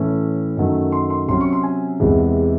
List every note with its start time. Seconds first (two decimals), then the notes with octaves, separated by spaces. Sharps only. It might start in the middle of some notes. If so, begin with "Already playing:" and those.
Already playing: A2 E3 A3 C#4
0.57 F#2 D#3 F#3 A3
0.92 C6
1.10 C6
1.28 C3 F#3 C#4 C6
1.41 C#6
1.53 C6
1.63 G#5
2.00 E2 C3 E3 G#3